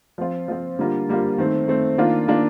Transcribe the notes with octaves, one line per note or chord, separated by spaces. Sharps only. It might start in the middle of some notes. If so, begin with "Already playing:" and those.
F3 C4 F4
F3 C4 F4
D3 G3 A#3 F4
D3 G3 A#3 F4
D#3 A3 C4
D#3 A3 C4
D#3 A#3 D4 F4
D#3 A#3 D4 F4